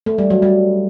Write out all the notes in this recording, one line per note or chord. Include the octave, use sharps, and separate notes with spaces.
A3
G3
F#3
G3